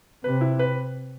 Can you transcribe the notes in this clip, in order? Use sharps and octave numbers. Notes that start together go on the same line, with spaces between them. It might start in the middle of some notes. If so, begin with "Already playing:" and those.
C3 B4
E4
B4